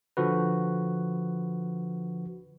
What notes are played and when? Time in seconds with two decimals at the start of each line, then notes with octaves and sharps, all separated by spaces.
0.17 D3 F3 F#4 B4